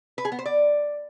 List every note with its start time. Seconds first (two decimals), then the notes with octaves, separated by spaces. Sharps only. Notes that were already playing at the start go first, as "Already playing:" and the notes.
0.18 B4
0.25 G#4
0.32 B3
0.39 C5
0.46 D5